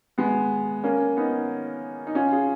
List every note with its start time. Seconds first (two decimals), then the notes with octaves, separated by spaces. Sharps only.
0.18 G#3 B3
0.84 A#3 C#4
1.17 B3 D#4
2.07 D#4
2.15 C#4 F4
2.32 F4 G#4